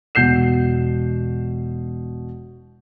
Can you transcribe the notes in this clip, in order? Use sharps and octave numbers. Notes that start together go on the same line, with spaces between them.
E1 B2 G6 C7 E7